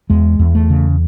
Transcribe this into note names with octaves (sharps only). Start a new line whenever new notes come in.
E2 G#3
E2
A3
C#3